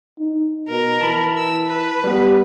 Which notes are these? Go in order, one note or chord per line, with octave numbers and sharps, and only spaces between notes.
D#4
B2 A#4
E3 A5 B5
E6
B4
G3 B3 G4